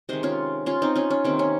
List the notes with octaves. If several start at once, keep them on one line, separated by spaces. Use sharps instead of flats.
C3 D#3 G#3 C5 D#5
C#4 F4
C#4 F4
C4 D#4
C#4 F4
C#4
C3 D#3 A#3 C4
C#4